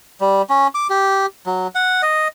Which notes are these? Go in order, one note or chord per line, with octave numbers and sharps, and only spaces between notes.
G3
C#4
D6
G4
F#3
F#5
D#5